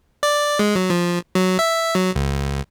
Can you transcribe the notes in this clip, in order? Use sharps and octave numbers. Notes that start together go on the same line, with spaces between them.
D5
G#3
F#3
F3
F#3
E5
F#3
C#2